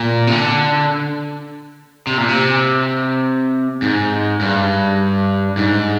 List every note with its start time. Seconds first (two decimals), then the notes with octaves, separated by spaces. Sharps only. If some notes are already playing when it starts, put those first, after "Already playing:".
Already playing: A#2
0.27 C3
0.31 D3
2.07 C3
2.18 A#2
2.29 C3
3.82 G#2
4.41 G2
5.57 G#2